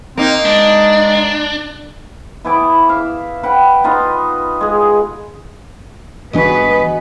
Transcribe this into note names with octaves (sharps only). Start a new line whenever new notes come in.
A#3 C4 D#4
G#3 D4
E3 B3 E4 D6
E5 F5
B4 F#5 G5
B3 D#4 F4 D#5
G#3 G#4
G1 E3 B3 D4 F#4 G#4 B4 D#5